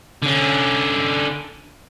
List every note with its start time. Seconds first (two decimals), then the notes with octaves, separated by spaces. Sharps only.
0.22 D3 C#4